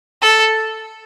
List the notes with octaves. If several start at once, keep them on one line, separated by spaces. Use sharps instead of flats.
A4